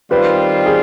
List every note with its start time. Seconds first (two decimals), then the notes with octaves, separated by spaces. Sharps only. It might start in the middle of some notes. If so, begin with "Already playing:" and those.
0.11 D#3 G3 C4 F4 B4
0.66 G#4